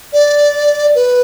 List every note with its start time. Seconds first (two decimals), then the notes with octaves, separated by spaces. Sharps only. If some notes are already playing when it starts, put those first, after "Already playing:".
0.13 D5
0.95 B4